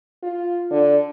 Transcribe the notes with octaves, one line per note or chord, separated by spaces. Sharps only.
F4
D3